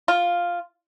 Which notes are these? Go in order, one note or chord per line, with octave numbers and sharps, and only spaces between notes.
F4